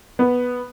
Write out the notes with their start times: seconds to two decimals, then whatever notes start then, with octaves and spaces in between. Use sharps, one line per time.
0.19 B3